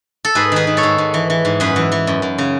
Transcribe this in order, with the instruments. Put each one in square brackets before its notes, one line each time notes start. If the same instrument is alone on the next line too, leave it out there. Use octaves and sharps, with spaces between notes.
[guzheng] A4
G#2 G#4 B4
D#3 G#4 B4
D#3
A4 C#5
G#2
G#2
E3
E3
G#2
F#2 G#4 B4
E3
E3
F#2
F#2
C#3